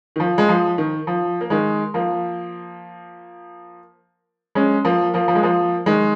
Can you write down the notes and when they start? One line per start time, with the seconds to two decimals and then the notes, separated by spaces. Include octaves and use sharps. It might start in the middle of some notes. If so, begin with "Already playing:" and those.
0.16 D#3
0.20 F3
0.38 G#3
0.49 F3
0.78 D#3
1.07 F3
1.41 A#3
1.50 D#3 G#3
1.94 F3 A#3
4.55 G#3 C#4
4.85 F3 A#3
5.14 F3 A#3
5.28 F3
5.35 G#3
5.43 F3 A#3
5.86 D#3 G#3